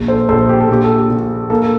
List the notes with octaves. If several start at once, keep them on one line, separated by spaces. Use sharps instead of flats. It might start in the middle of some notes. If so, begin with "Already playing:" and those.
Already playing: A#1
A4 C5
A#1 A4 C5
G4
A4
A#2 G4
A4
G4
A#2
A#3 A4
A4